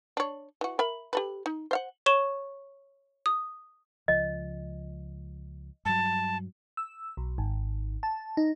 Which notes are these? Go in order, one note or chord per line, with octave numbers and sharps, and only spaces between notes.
D4 C#5
E3 F#4
A#4 E5 B5
G4 A4 B4
D#4
C5 F5 F#5
C#5 C#6 E7 G7
D#6
C#2 F3 D#5
G2 F#3 A5
E6
B1
G#1
A5
D#4